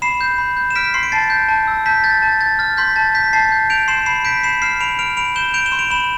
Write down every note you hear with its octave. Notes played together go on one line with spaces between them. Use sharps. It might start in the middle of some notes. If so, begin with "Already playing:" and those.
B5 C7 E7
G6
B5
G6
E7
F6 B6 D7
C6 C7
D7
A5 A6 C7
G6
A5
E6
A5 G6 B6
G6 A6
A5 A6
G6 A6
F6 A6
C6 G6 B6
A5 A6
G6 B6
A5 A6 C7
G6
G6 D7 F7
C6 C7 E7
B5 C7 E7
G6 B6 D7
B5 C7 E7
F6 C7 E7
B5 D7 F7
F6 D7 F7
B5 D7 F7
G6 E7 G7
G6 D7 F7
E7 G7
C6
D7 F7
B5 E7 G7